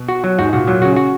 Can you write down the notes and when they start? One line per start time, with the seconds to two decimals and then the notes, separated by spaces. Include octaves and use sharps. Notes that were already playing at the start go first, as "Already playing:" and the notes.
Already playing: B2
0.08 F#4
0.24 F#3
0.39 G#2 F#4
0.53 A#2 F#4
0.67 A#2 F#3
0.82 C#3 F#4
0.96 F#4